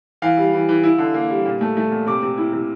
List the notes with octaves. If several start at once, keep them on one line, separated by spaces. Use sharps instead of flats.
E3 F5
G3
E3
E3
E4
D3
A#3
G3
A#2
A3
A3
A#2
C3 D6
C3
E4
C3